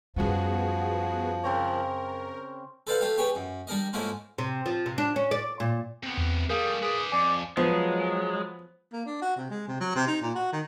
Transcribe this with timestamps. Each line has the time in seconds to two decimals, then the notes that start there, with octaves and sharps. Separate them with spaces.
0.16 F#2 F3 G3 B3 F#4 G#4
1.43 C#3 C4 A#4 C#5
2.87 A4 B4 C5 D5 F5 F#5
3.01 A3 F4 G4 F5
3.17 G4 G#4 B4 C#5 G5
3.35 F#2
3.67 G3 D4 A#4 D#5
3.93 G#2 A3 A#3 C#4 E4 F4
4.38 C3
4.66 F3
4.86 C3
4.98 D4
5.16 C#4
5.31 D5
5.60 A#2
6.03 C3 B3
6.17 E2
6.50 G3 A3 G#4 A#4 F5
6.82 G#4 B4 D5
7.12 F2 D5 G#5
7.57 F3 F#3 G#3 B3
8.93 A#3
9.06 D4
9.22 F#4
9.36 C3
9.50 G#3
9.68 C3
9.80 F#3
9.95 C3
10.07 D#4
10.22 A#2
10.35 F#4
10.52 D#3